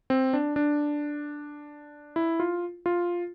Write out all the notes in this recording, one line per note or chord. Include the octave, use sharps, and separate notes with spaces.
C4
D4
D4
E4
F4
F4